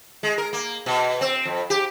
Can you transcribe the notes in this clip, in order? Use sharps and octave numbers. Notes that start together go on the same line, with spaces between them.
G#3
A#4
A#3
B2
C4
F2
G4